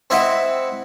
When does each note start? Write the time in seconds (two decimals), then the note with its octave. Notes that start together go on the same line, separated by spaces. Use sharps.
0.10 C4 E4 D#5 E5 F#5